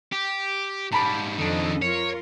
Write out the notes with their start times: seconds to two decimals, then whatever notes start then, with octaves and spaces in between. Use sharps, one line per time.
0.12 G4
0.92 G#2 G3 A5 B5 D6
1.38 F2 D#3 D4 A4 D#5
1.82 F4 A#4 C#5